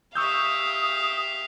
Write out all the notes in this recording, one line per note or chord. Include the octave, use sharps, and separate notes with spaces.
G4 E5 F5 C#6 D#6 E6 G6